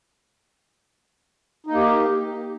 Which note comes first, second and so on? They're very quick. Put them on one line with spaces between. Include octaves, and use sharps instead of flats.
D#4 A#3 G4